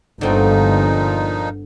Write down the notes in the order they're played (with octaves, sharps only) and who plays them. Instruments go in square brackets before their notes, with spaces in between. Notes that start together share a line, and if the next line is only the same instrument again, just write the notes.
[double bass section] G1 [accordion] A#2 F3 D#4 [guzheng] D3 C4 F#4